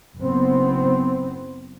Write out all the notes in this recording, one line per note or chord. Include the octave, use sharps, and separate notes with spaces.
F#1 B3 C4